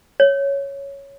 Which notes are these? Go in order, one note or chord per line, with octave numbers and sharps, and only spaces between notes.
C#5